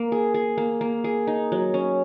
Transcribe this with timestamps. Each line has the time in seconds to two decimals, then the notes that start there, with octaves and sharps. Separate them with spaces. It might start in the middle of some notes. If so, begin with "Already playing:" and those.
Already playing: A#3
0.12 G#4
0.34 G#4
0.58 A#3
0.81 A#3
1.04 G#4
1.27 D#4
1.52 F#3
1.74 C#4